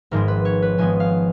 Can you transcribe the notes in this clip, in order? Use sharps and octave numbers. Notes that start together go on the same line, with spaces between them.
G#1 G#2 F3 G#3 B3 A#4
B4
C#5
B4
G#1 G#2 F3 G#3 B3 G#5
F5